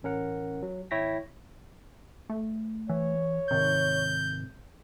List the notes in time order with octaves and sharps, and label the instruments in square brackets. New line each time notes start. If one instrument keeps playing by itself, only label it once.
[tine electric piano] A1 C#4 A#4 F#5
F#3
G#1 E4 C#5 G5 A#6 B6
[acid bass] A3
[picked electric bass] E3 [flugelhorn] C#5
[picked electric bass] G#2 C3 [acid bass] D#3 [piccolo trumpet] G6